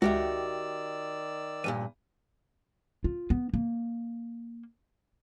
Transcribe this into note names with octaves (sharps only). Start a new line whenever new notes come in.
C#2 D#3 F#4 G4 D5 E5 E6
E2 G2 A#2 D#7
F4
B3
A#3